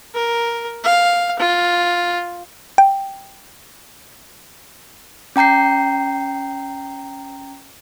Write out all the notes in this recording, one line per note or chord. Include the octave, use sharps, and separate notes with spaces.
A#4
F5
F4
G5
C#4 G5 A#5 G6 C7